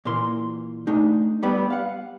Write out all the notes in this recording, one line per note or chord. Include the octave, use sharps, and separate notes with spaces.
A#2 E3 A#4 C6
A3 D4 D#4
G3 B3 B5
F5 F#5